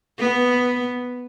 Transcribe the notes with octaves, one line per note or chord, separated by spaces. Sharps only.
B3